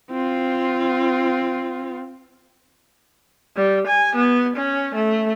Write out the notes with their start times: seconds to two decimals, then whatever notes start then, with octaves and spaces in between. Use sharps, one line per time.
0.11 C4 F4
3.56 G3
3.87 G#5
4.16 B3
4.56 C#4
4.94 A3